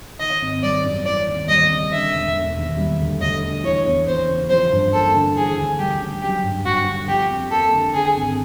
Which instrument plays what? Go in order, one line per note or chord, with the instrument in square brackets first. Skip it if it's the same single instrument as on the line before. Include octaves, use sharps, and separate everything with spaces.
[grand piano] D#3 [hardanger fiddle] D#5
[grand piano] G#1
[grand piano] G3 [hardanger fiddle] D5
[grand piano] F#2
[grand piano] E3 [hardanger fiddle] D5
[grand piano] D#2
[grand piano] G3 [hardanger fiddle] D#5
[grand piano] C#3
[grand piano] D3 [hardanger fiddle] E5
[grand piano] E1
E1
D#2
G3
D2
[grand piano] D2 [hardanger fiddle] D#5
[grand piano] D3
[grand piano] E3 [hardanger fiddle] C#5
[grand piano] E2
[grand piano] E2 [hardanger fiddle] C5
[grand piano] C#3
[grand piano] F3 [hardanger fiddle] C5
[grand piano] G2
[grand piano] A#3 [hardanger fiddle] A4
[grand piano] D3
[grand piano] E3 [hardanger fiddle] G#4
[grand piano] D2
[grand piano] G3 [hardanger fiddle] G4
[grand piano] C#3
[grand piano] F#3 [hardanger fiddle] G4
[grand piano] G2
[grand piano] G2 [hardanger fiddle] F#4
[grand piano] D3
[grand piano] F3 [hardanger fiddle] G4
[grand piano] F2
[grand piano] A#3 [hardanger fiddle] A4
[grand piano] D3
[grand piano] D3 [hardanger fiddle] G#4
[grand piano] G#1